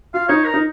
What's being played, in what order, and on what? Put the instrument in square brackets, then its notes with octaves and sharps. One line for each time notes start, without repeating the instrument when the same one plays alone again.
[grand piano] F4 [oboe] F5
[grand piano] D#4 [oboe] C#5
[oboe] A#4
[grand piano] D#4